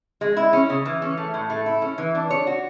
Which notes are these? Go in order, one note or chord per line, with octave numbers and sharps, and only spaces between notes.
G#3
E4
C#4
C#3
E3
C#4
A3
A2
A3
E4
C#4
E3
D4
C#5
F#4